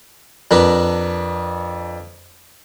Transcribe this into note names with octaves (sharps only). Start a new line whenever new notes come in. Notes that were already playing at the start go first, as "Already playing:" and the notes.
F2 D4 A#4 B4